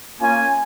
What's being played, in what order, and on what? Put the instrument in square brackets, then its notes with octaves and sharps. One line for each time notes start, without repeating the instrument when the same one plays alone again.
[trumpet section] A#3 C#4 F4 G#5